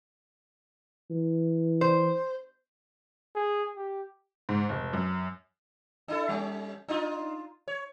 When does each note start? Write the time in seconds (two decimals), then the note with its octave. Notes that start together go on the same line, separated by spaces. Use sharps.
1.11 E3
1.81 C5
3.36 G#4
3.76 G4
4.49 G#2
4.69 F1
4.93 F#2
6.08 D4 E4 A4
6.29 G3 C#4
6.88 D4 D#4 F4
7.68 C#5